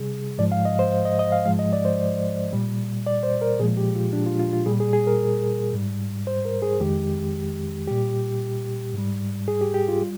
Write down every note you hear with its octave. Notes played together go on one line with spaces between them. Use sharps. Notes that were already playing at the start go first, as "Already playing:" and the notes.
Already playing: C3 G3 G#4
G#2 F3 G#3 D5
F5
D#5
C5
D#5
D#5
F5
G#2 F3 G#3 F5
D#5
D5
C5
A#2 G3
D5
C5
A#4
A#2 F3 G#3 G#4
G4
F4
D4
F4
F4
F4
A#2 G3 G#4
G#4
G#4
A#4
G#2 G3
C5
A#4
G#4
F2 D#3 G#3 G4
A#2 G3 G4
G#2 G3
G#4
G4
G4
F4
G3